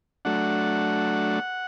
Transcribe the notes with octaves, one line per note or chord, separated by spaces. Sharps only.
F#3 A3 D4 F#5